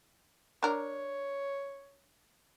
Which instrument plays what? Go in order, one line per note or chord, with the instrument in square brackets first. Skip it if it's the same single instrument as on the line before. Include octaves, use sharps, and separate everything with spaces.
[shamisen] D4 A#4 [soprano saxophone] C#5